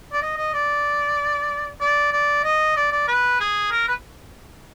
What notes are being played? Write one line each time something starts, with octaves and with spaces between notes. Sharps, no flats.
D5
D#5
D#5
D5
D5
D5
D#5
D5
D5
B4
G#4
A#4
B4